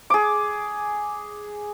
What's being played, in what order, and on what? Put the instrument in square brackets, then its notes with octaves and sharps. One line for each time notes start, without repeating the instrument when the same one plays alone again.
[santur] G#4 D6